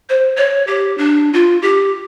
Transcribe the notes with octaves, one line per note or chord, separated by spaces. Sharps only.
C5
C#5
G4
D4
F4
G4